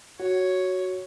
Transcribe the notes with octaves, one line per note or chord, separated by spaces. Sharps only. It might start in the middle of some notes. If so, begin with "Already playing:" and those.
F#4 C#5